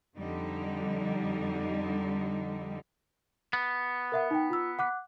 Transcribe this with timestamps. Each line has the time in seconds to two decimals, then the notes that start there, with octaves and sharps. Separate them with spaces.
0.17 F2 D3 G3 D#4
3.53 B3
4.12 A#4 E5 F#5
4.31 D#4 G5
4.50 F4 E6
4.79 F#5 D6 F#6